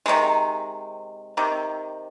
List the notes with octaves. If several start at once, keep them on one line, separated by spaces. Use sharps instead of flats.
C3 D#3 G#3
C3 D#3